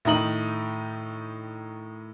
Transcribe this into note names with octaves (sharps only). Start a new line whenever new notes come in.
A2 D#3 D#4 F#7